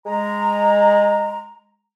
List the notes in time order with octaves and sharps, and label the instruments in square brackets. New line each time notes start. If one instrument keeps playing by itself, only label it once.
[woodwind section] G#3 A#5